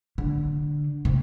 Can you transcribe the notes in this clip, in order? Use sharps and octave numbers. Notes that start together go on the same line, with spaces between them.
D3
C3